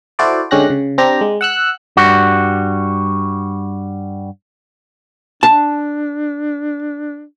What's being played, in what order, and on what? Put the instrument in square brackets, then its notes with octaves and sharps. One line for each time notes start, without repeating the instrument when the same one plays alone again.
[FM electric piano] E4 F#4 A4 C5 D5
D3 G#3 C#4 G4 F#6 A#6
C#3
C4 D4 G4 A#5
G#3
F#5 E6 F#6
[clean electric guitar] G2 G3 F#4
[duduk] D4 [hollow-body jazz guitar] A5